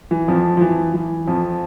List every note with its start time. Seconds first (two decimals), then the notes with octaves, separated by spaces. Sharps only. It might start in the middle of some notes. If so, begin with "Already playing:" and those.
0.11 E3
0.28 F2 F3
0.57 F3
0.61 E3
0.94 E3
1.27 F2 F3